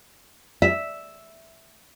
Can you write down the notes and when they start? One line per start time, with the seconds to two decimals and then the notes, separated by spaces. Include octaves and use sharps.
0.62 E5